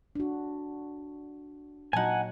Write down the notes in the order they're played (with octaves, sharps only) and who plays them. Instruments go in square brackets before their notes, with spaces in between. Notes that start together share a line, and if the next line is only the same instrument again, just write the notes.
[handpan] D4 F#4
[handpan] A#2 F#3 F#4 [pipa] D#4 A5 [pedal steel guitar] F#5 G#5